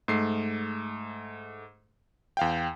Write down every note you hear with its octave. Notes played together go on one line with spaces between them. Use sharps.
G#2 A3 C7
E2 F5 G5